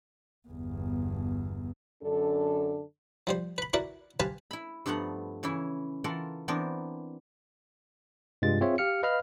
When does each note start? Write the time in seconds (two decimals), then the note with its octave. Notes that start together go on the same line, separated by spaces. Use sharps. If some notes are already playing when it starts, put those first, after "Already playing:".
0.48 G1 E2
2.03 F#2 D3 D4 A4
3.27 F3 G3 C5
3.58 B4 B5
3.73 E4 F#4 A#4 B4 D5
4.20 G4 B4 C5 F5 G#5 A5
4.51 E4 B5
4.86 G2 F3 A3 B3 F#5 A#5
5.43 C#3 E3 C#4 E4
6.04 E3 F4 A4 A#4 F#5
6.48 E3 B3 C4 D4 A#4
8.42 G2 C3 G3 G#3 F4 A6
8.61 C4 F4 G#4 C#5 E5
8.78 G4 F5 F6 C#7
9.03 B4 D#5 F5 B5 F6